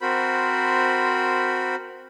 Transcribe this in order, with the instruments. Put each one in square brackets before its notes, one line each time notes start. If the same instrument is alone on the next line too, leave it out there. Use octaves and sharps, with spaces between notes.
[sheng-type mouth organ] C4 F#4 A#4 C5 B5